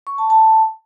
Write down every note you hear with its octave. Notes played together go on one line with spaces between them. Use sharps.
C#6
A5
A5